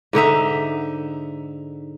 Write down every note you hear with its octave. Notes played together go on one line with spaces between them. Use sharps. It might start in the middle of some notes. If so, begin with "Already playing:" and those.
G#2 D3 D#4 E5